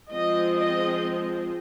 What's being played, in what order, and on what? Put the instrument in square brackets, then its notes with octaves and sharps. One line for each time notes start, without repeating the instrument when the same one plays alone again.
[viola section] F3 G#3 C4 D#5
D#5